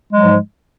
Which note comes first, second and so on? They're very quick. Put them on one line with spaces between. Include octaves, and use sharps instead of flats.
G#3 F#3 F3 G#2